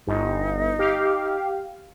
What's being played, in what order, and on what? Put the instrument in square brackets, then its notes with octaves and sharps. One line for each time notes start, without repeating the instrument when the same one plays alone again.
[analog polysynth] G1 [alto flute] D#4
[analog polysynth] G4 F5